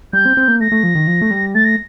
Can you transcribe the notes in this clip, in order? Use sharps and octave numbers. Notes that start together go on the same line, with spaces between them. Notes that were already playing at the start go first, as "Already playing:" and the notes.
G3 G6
C4
C4
A#3
A3 A#6
A3
F3
D#3
F3
A3
G3
A3 A6
A#6